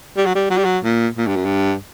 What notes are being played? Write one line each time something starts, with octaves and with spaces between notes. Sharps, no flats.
G3
F#3
G3
F#3
G3
F#3
A#2
A#2
G2
F#2
G2